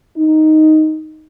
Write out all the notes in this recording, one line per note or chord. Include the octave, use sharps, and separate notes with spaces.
D#4